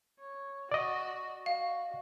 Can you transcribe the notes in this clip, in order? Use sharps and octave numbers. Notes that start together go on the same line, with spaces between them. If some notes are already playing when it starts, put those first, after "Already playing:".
C#5
F#4 D5 D#5
F#4 F5